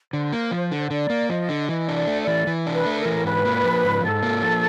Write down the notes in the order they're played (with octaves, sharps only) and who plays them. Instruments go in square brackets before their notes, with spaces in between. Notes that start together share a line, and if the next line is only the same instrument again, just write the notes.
[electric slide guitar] D3 [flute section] C5
[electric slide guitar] A#3
F3
D3
[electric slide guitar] D3 [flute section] D5
[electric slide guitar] A#3
[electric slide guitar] F3 [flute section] D#5
[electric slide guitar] D3
[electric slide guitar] E3 [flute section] D#5
[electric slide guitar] D4
[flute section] D5
[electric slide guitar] A3
[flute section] D5
[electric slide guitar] E3
E3
D4
[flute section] B4
[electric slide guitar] A3
[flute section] A#4
[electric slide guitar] E3
[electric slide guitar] G#2 [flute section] B4
[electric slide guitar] A#3
F3
G#2
[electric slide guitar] G#2 [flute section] A4
[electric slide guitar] A#3
F3